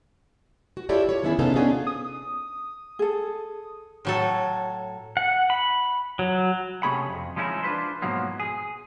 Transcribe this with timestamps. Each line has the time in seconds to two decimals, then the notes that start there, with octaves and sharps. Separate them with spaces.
0.77 F#4
0.89 E4 F4 G4 A4 C#5 D5
1.09 C#5
1.23 D#3 E3 B3 C#4 E4 G#4
1.39 C3 B3 C#4 D#4 F4 A4
1.56 B3 C#4 D4 F4 G#4
1.87 D#6
2.99 G#4 A4
4.05 A2 F#3 A4
5.17 F#5
5.50 B5
6.19 F#3
6.83 C3 A3 C#4 G#4 B5
7.08 F2
7.36 F3 G#3 C#4 D#4 E4
7.63 D4 F4 B4 C5
8.02 G#2 B2 F3 F#3 A#3
8.40 G#4